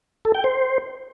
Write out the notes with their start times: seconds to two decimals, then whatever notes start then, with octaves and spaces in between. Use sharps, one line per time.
0.25 A4
0.35 G5
0.44 C5